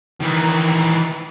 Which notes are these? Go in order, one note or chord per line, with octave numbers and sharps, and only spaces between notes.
D#3 E3